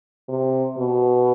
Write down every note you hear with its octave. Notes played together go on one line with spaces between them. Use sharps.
C3
B2